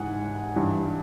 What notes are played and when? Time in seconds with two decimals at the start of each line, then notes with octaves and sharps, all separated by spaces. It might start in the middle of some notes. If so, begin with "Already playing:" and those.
Already playing: G#2 E3 F#5 G#5
0.56 G2 E3